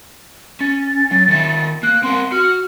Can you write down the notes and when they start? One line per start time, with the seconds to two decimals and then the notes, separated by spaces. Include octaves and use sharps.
0.61 C#4 A6
1.11 F#3
1.28 D#3 C#5 E5
1.83 A#3 F#6
2.03 C4 A#4 C6
2.32 F#4 F6